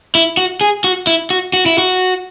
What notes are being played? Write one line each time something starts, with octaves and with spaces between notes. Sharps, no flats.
E4
F#4
G#4
F#4
E4
F#4
F#4
E4
F#4